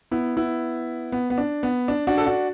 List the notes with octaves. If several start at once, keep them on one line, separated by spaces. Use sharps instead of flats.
B3 E4
B3 E4
B3
B3
D4
B3
D4
D4 F#4
A4
D4 F#4